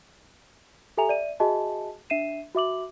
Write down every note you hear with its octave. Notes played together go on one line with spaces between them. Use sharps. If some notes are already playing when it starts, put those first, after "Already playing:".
G4 A4 E5 G#5 A#5 F7
D5 E5 D#7
F#4 G#4 D#5 E5 G#5 A5
D4 E5 C7 D#7 E7
F#4 E5 D6 F#7